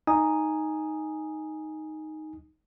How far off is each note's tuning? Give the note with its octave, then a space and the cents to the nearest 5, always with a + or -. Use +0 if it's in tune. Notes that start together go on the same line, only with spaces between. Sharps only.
D#4 +0 G#5 +0 D#6 +0